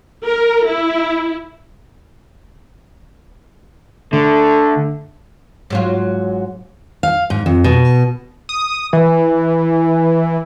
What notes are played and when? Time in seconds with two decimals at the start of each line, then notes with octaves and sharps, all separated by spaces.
0.24 A#4
0.68 E4
4.13 D3 A3
5.70 G#2 F#3 F4
7.03 F5
7.30 G#2
7.46 F2
7.64 B2
8.49 D#6
8.93 E3